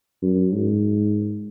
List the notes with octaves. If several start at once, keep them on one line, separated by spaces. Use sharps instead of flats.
F#2
G#2